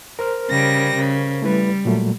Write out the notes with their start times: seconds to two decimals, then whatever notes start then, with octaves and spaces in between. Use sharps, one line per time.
0.19 A#4 C5 F6
0.50 C#3 G3 A#6
0.96 C#3
1.42 G3 A3 E4 B4
1.85 A#2 F#3 A3